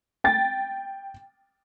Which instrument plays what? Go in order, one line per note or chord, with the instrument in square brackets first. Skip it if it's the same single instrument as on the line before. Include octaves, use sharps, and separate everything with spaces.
[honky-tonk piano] G5 A6